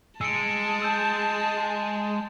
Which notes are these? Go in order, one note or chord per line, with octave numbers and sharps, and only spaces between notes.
G#3 G#4 A5 E6 C#7 D7
E6 G6